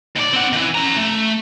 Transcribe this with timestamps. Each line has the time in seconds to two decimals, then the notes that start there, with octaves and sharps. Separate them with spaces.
0.16 D#2 D5
0.33 C4 F#5
0.53 D#3 E3
0.75 C#4 A#5
0.96 A3